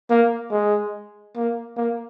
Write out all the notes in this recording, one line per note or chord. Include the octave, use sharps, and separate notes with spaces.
A#3
G#3
A#3
A#3